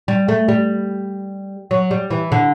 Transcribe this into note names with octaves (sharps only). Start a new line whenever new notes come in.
G3
A3
G3
F#3
G3
E3
D3